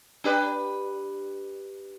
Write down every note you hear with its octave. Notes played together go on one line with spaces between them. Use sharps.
D4 G4 B4